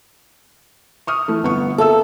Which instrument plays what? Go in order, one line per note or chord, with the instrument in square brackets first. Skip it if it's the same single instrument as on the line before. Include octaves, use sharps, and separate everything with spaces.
[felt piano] C#6 D#6 F6
E3 A3 E4
G1 B3 C#6
[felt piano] A#3 E5 E6 [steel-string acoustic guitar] A4